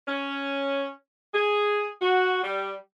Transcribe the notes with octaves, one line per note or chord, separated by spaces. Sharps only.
C#4
G#4
F#4
G3